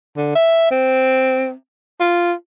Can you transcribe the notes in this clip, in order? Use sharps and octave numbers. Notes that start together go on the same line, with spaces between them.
D3
E5
C4
F4